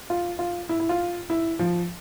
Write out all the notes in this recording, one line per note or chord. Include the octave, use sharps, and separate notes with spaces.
F4
F4
E4
E4
F4
E4
F3